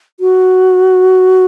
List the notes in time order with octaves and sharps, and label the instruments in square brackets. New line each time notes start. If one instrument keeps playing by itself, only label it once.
[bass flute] F#4